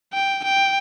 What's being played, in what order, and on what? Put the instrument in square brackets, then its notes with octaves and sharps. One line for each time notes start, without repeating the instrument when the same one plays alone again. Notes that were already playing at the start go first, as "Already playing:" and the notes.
[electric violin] G5
G5